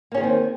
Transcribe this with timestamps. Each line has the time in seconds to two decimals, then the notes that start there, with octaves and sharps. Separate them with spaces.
0.12 A#3
0.15 C#4
0.17 G#4
0.20 D#3
0.23 C4